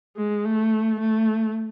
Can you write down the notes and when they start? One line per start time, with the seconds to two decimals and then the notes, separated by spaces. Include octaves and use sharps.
0.16 G#3
0.45 A3
1.00 A3